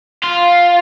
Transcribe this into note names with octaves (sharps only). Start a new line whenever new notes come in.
F4